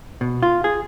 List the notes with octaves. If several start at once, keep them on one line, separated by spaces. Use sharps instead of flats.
B2
F4
G#4